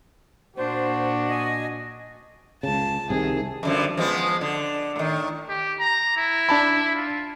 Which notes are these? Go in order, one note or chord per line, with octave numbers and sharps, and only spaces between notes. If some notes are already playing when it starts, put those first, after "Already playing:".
A#2 D4 F#4 C5
D#5 G#5
C#2 C#3 A5
C2 C3 D#3 G#4
F#2 D3 F3
F3 G#3 B3
D3
A2 D#3
G4
A#5
E4
D4 A5 B5
F4